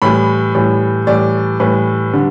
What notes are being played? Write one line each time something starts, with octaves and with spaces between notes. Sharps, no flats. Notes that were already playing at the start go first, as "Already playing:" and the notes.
A2 E3 G3 B5
A2 E3 G3
A2 E3 G3 D5
A2 E3 G3 B4
D3 G3